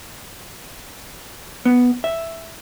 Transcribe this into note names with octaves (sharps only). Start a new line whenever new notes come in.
B3
E5